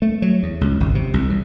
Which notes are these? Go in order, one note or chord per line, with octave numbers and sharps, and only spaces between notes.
A3
F#3
E2
C#2
G#1
C3
C2
E2